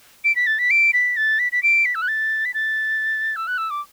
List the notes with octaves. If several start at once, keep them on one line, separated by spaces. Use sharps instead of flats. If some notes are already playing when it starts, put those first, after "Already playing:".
D7
B6
A6
B6
D7
B6
A6
B6
B6
D7
B6
E6
F#6
A6
B6
A6
E6
F#6
E6
D6